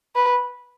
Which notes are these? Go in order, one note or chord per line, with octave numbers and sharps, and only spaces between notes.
B4